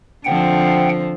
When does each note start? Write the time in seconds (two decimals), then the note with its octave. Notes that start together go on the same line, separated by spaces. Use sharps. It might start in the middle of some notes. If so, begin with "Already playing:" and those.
0.25 D3 F3 C4 F#5 G5